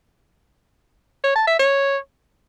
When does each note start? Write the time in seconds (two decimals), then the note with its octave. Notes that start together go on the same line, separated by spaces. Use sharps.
1.23 C#5
1.35 A5
1.47 E5
1.59 C#5